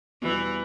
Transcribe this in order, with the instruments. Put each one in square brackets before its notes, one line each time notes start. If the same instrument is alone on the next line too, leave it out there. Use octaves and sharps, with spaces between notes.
[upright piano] E2 B2 G3 B3 [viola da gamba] E3